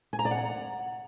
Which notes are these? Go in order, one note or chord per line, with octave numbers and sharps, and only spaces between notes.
G#5
A#5
D5
F#5